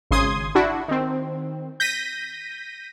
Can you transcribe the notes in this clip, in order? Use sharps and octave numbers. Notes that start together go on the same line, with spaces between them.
G#1 C#3 C6 D#6 G#6
D4 E4 F#4
D#3 C4
G6 A#6 B6 D#7